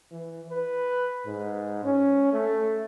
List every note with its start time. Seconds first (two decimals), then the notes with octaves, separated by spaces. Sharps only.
0.11 E3
0.50 B4
1.27 G#2
1.84 C#4
2.33 A3